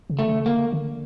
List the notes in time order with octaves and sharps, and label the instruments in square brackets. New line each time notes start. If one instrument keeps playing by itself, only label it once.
[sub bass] C#3
[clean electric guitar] A3
[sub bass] C#3
[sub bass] D3 [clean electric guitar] A#3
[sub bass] D3